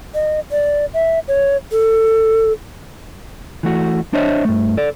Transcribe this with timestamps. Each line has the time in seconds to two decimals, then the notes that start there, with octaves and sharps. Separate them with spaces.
0.15 D#5
0.52 D5
0.94 E5
1.28 C#5
1.72 A4
3.63 E3 A3 F#4
4.13 D4 C5 C#5 D#5 E5
4.45 G2 A3
4.77 A4 D5